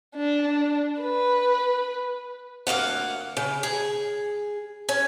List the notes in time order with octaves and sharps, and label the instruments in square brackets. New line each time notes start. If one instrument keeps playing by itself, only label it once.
[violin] D4
B4
[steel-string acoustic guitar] D2 A#3 F5 F#5
C#3
G#4
C#4